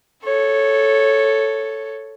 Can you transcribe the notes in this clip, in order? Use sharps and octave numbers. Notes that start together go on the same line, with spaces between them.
A4 C#5